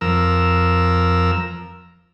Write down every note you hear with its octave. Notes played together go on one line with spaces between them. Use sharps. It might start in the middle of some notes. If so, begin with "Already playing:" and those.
F2 A#4 E6